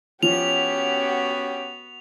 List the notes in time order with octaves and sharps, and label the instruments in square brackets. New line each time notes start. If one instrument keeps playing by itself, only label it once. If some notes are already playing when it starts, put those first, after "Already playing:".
[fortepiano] F3 [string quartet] B3 F#4 [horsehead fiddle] C#4 G4 [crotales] F7